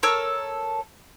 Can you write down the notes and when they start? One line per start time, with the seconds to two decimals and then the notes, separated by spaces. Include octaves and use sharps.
0.03 A4 A#4 C#5 E6